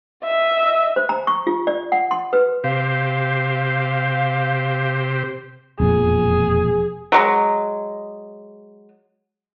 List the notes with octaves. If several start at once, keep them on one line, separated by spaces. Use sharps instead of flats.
D#5 E5
C5
A#5
C#6
F4
D5
F#5
C6
B4
C3 G4 C5 F5
E1 F2 A#2 G#4
F#3 G#3